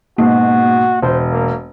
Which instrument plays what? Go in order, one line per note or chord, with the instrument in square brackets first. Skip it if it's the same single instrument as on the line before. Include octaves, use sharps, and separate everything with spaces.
[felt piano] G#2 B2 [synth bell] A#3 [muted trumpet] F#4
[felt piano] E1 [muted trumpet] C5
[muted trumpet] A#3